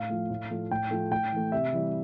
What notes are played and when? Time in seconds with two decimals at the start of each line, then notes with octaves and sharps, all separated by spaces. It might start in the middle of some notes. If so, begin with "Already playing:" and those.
Already playing: A2 F5
0.10 F3 A3
0.30 A2
0.50 F3 A3
0.71 A2 G5
0.91 F3 A3
1.11 A2 G5
1.32 E3 A3
1.52 C3 E5
1.73 E3 G3